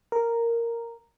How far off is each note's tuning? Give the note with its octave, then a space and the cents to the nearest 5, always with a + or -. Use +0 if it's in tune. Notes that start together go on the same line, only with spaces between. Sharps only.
A#4 -5